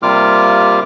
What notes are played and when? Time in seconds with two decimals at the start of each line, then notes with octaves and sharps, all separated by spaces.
0.03 C3 G3 A#3 F4 D6 F6